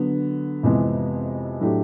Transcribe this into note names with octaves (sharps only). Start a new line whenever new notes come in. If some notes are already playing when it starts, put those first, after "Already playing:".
Already playing: D3 F#3 B3
F2 C3 E3 G#3 B3
A2 F#3 A3 D4 G4